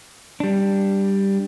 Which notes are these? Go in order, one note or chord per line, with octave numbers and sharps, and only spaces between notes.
G3 D4